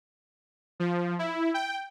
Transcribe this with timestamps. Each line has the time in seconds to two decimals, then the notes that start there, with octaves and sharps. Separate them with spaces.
0.80 F3
1.19 E4
1.54 G5